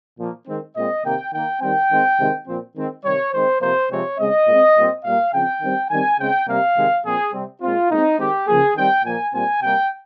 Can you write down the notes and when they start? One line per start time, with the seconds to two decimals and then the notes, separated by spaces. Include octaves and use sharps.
0.18 A#2 F3 A#3
0.47 D#3 G#3 C4
0.76 A#2 G#3 C4 D#5
1.04 C3 D#3 A#3 G5
1.32 D#3 A#3 G5
1.61 D#3 G3 C4 G5
1.90 D#3 G#3 C4
2.19 C3 D#3 G#3 C4
2.47 A#2 F3 C4
2.75 D#3 G#3 C4
3.04 C3 D#3 G3 C#5
3.33 D#3 G#3 C4 C5
3.61 C3 F3 A#3 C5
3.90 C3 F3 G#3 C4 C#5
4.18 C#3 G#3 C4 D#5
4.46 A#2 G#3 C4
4.75 A#2 G3 C4
5.04 A#2 G3 A#3 F5
5.33 C#3 F3 C4 G5
5.61 D#3 G3 C4
5.90 D#3 G3 C4 G#5
6.18 C#3 G#3 C4 G5
6.47 C3 G3 A#3 F5
6.76 C3 D#3 G#3
7.04 A#2 F3 C4 G#4
7.33 C3 G3 C4
7.61 A#2 G#3 C4 F4
7.90 A#2 G#3 C4 D#4
8.18 D#3 G#3 C4 G4
8.47 C#3 F3 A#3 G#4
8.76 D#3 G3 C4 G5
9.04 A#2 F3 A#3 G#5
9.32 A#2 G3 C4 G#5
9.61 C3 G3 A#3 G5